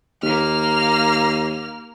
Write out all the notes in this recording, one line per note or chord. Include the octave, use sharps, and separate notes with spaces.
D#2 A#3 F6